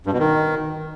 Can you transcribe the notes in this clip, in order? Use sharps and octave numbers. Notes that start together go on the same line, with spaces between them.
G2
B2
D#3